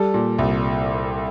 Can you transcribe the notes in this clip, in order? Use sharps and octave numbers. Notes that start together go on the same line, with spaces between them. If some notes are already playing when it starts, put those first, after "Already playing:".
Already playing: G3 A4
A#2
C2